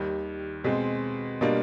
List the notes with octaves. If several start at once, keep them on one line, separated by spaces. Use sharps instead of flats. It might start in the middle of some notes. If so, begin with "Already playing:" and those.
Already playing: D#2 D#3 G3
B2 G#3 C4
B2 G3 A#3 D4 F4